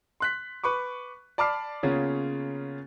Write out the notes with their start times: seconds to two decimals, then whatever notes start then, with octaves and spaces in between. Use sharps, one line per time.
0.20 C6 F#6 B6
0.64 B4 B5 C#6 D6
1.38 D5 A5 B5 D6 F6 C7
1.83 C#3 A#3 B3 C#4 F4 G#4